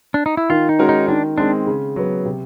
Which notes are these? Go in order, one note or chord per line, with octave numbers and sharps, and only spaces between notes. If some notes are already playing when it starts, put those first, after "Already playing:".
D4
D#4
E4
D#3 F4
D#4
G#3 C#4 F#4 A#4
D#4
D#3 D4
G#3 C4 D4
C#3
F#3 B3
C3